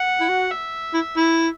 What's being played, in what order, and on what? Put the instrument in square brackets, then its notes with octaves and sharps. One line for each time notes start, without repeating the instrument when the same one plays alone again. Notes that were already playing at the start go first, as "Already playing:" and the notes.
Already playing: [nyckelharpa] F#5
[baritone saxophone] E4
F#4
[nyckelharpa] E5
[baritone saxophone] E4
E4